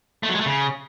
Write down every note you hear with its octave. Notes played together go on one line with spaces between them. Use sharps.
A3
F#3
G#3
A3
C#3